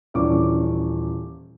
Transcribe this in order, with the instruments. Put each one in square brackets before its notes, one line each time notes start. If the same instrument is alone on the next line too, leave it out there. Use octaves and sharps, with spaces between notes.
[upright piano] D#1 E3 C#4 D4 C#6 D6